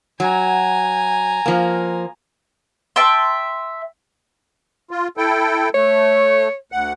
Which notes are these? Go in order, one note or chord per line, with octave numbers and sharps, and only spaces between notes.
F#3 G#5 A#5
F3 A#3
E5 G5 A5 C6
F4
E4 A4 G5
A3 C#5
D2 F#5